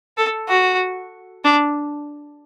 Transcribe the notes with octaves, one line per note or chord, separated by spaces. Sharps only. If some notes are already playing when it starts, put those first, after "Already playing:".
A4
F#4
D4